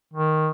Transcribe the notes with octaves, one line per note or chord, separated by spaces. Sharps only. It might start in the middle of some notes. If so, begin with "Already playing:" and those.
D#3